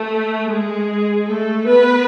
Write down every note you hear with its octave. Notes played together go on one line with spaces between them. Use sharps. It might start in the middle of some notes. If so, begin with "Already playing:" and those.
Already playing: A3
G#3 G#4
A3 A4
B3 B4